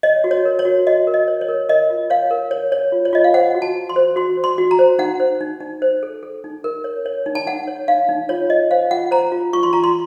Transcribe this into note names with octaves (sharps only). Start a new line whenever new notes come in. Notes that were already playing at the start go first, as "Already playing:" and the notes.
C#5 D#5
F#4
C#5
A#4
C#5
F#4
F#4 D#5
A#4
D#5
C#5
C#5
A#4
A#4 D#5
F4
C#5 F5
A#4
C#5
C#5
F4
C#5
F4 D#5
F5
C5 F#5
F#4
A5
F#4
C6
C5
F#4 C6
C5
C6
F#4
A#5
C5
D#4 F#5
C5
D#4
D#4
C5
A4
A4
D#4
A#4
C#5
C#5
D#4
A5
D#4 F#5
C#5
D#4 F5
D#4
F4 C#5
F4 D#5
C5 F5
F4 F#5
C5 A#5
F4
F4 C#6
C6
F4 A#5
C6